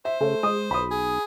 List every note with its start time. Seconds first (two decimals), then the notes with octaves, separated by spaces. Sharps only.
0.05 C5 E5
0.21 C#3 A3
0.43 G#3 D#6
0.71 B1 B5 D#6
0.91 G#4